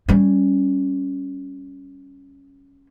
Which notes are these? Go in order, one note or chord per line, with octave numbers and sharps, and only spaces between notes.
G3 C#4